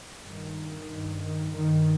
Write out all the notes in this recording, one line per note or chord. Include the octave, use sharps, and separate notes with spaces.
G2 D#3
G2
D#3
G2 D#3